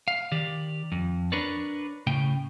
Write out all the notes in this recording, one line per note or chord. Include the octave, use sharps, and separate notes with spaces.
F5
D#3 G4 D5
F2
D4 A#4 B4 C#5 D5
A2 C#3 G5